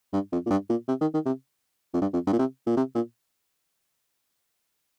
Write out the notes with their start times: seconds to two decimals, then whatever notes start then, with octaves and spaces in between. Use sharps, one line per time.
0.13 G2
0.32 F2
0.46 A#2
0.50 G2
0.70 A#2
0.88 C3
1.01 D#3
1.14 D#3
1.26 C3
1.94 F2
2.02 G2
2.13 F2
2.27 G2
2.33 A#2
2.39 C3
2.66 A#2
2.77 C3
2.95 A#2